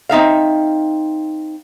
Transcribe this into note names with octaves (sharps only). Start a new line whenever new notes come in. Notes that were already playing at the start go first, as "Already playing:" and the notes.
C4 D#4 E5 F5